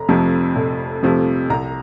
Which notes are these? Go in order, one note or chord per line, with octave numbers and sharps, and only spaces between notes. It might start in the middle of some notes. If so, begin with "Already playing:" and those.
Already playing: F1 A#5
F2 C3 F3 A3
F1
F2 C3 F3 A3
C2 A#5